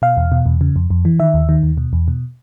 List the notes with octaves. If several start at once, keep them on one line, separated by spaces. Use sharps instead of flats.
B2 F5
E2
B2
E2
C#3
F2
F2
E3
D#3 E5
D#2
D#3
D#2
B2
E2
B2